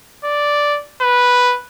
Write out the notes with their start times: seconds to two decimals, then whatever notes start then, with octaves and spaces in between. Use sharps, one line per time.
0.24 D5
1.01 B4